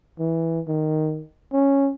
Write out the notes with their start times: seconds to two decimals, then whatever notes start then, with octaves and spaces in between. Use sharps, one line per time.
0.19 E3
0.68 D#3
1.53 C#4